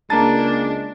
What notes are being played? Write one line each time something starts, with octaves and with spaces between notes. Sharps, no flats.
C#2 G#3 A#3 D4 A5 A#5 A6